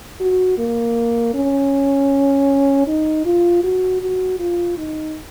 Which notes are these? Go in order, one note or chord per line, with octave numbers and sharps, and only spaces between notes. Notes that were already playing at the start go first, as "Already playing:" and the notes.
F#4
A#3
C#4
D#4
F4
F#4
F#4
F4
D#4